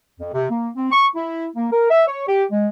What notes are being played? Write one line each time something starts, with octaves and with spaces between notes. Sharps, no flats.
F2
C3
A#3
C4
C#6
E4
A#3
A#4
E5
C#5
G4
G#3